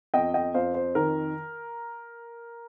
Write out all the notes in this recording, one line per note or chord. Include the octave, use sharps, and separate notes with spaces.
F2 D#5 G5
D#5 G5
F2 C5 F5
C5
D#3 A#4